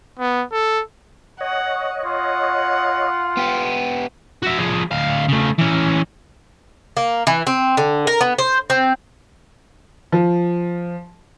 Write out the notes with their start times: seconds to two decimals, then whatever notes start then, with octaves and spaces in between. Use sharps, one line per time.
0.19 B3
0.52 A4
1.41 C#5 D#5 F#5
2.04 F4 F#5
3.37 B3 G4
4.42 F#4 E5
4.59 F3 G#4
4.91 D2 F5
5.29 C#3 A3
5.58 E3 C#4
6.97 A#3
7.27 E3
7.47 C4
7.77 D3
8.07 A#4
8.21 B3
8.38 C5
8.70 C4
10.12 F3